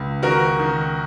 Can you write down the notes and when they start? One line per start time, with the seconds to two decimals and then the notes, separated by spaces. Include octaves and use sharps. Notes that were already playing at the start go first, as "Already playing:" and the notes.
Already playing: C#2
0.23 D#3 F#4 A#4
0.59 D#3